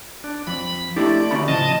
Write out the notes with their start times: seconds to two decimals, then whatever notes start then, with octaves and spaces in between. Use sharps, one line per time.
0.24 D4
0.47 F2 B5
0.96 A3 D4 E4 G4 D5
1.31 D2 C#4 B5
1.48 A2 C#3 F3 D#5 A5